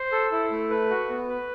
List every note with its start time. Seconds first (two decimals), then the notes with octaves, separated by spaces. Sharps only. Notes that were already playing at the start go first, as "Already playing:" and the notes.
Already playing: C5
0.12 A4
0.32 E4
0.51 A3
0.70 B4
0.91 F#4
1.10 B3
1.28 B4